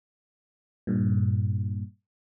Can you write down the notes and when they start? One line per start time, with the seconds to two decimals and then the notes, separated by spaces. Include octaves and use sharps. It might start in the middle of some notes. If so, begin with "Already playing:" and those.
0.87 G2 A#2